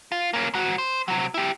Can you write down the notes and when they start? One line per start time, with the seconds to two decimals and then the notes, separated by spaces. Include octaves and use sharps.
0.12 F4
0.33 A#3 C#4
0.54 G#2 F#4
0.78 C5
1.08 C3 F#3
1.34 E4 G4